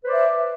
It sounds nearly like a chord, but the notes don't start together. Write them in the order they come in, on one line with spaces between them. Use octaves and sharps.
B4 C5 D5 E5